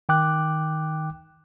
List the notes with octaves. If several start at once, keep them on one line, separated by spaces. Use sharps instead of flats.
D#3 G5 D6 F#6